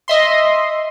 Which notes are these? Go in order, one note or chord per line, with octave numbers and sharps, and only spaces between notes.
D#5 E5 C6